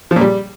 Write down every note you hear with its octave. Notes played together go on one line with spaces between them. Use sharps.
F3
A#2
G3